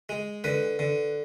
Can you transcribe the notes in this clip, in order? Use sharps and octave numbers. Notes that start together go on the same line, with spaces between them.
G#3
D3 B4
D3